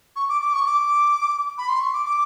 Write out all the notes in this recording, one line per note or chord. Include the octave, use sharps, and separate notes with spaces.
C#6
D6
D6
C#6
D6
B5
C6
C#6
D6
D6